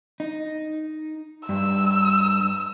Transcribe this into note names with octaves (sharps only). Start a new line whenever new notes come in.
D#4
G2 E6